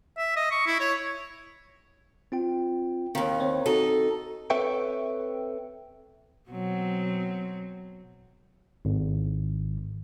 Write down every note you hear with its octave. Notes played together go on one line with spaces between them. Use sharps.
E5
D#5
C#6
E4
C#5
C4 F4 G5
D#2 D#3 C4 F5 G5
C4 C5 C#5
C4 D#4 F#4 A4
C4 A4 B4 C#5 E5 G5
B2 F#3 C4
G#1